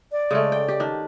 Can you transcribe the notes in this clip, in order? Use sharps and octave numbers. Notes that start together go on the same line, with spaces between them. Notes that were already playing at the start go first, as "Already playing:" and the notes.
D5
C#3 G#3 A3
G5
G4
D#3 D4